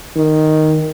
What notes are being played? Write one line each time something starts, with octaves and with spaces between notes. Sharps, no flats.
D#3